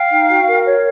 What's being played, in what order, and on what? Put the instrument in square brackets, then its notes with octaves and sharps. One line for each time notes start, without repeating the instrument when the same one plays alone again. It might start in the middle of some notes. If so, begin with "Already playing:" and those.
Already playing: [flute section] F5 G5
D#4
F#4
A#4
C#5